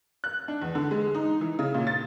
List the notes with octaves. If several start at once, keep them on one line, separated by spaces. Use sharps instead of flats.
F#6
D4
E2
D3
G#3
D#4
E3
C#3
A#2
A6